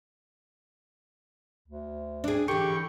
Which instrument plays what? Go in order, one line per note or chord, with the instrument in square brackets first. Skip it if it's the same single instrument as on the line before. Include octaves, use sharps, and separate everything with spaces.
[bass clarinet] D2
[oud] D4 G#4
[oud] D3 E3 [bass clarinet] G4 [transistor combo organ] G5 C#6